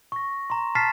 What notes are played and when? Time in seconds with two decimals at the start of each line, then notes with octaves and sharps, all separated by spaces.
0.12 C#6 A#6
0.50 A#5 C6
0.75 A5 F6 A6 B6 C7 E7